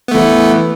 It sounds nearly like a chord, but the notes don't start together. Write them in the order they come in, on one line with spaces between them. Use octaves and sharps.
B3 A3 E3